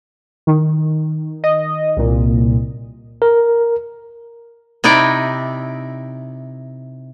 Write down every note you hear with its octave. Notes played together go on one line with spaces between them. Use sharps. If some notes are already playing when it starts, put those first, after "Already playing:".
D#3
D#5
C2 A#2
A#4
C3 D#4 E4 D5 G5